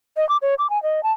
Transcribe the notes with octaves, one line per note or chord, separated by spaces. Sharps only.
D#5
D6
C#5
D6
G#5
D#5
A5